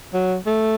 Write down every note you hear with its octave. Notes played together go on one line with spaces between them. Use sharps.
F#3
A3